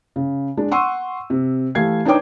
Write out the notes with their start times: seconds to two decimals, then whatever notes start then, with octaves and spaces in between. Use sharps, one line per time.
0.16 C#3
0.57 G#3 D4
0.71 F#5 C6 C#6 E6 D#7
1.30 C3
1.75 E3 A3 G4 F5 G#6 C7
2.05 D4 D#4 B4 C#5 G5 D6